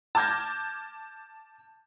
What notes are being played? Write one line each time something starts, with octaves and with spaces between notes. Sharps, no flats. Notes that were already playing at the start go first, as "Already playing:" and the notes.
A5 D6 F6 G6 G#6 A#6